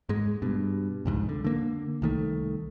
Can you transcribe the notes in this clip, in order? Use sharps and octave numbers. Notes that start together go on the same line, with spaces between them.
G#2 G#3
G2 B2
C2 F2 G#2
D3
D3 A#3
C2 D#3 A3